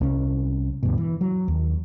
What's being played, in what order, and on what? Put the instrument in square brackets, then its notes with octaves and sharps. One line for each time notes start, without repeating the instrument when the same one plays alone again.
[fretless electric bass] C2 C#4
D2 G2 B2
E3
F#3
D#2